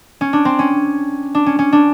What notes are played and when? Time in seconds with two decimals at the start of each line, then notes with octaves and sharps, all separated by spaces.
0.21 C#4
0.33 D4
0.45 C4
0.59 C#4
1.35 D4
1.46 C#4
1.59 C#4
1.72 D4